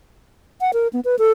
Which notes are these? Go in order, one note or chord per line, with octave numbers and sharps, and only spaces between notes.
F#5
A#4
B3
B4
A4